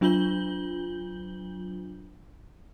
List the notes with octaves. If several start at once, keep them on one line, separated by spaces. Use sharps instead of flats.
F#3 D4 F4 G6 F#7 G7